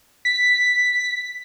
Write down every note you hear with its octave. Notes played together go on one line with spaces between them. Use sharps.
B6